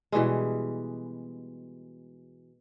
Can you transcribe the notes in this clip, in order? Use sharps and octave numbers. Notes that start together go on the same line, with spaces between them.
B2 E3 G3 G#3